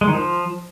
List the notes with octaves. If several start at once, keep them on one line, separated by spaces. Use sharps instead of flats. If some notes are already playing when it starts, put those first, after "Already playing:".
G#3
D#3
F3